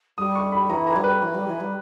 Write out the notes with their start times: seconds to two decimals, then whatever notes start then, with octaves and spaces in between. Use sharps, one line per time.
0.18 G3 D#6
0.36 C#6
0.52 B5
0.70 E3 A#5
0.87 A#5
0.96 G3
1.04 B4
1.22 E3
1.34 G3
1.47 E3
1.60 G3